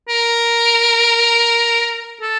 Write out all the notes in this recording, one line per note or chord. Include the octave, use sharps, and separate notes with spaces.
A#4
A4